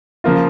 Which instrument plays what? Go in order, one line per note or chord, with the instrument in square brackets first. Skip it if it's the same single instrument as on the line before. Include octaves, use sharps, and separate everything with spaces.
[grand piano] C#3 F3 A#3 F4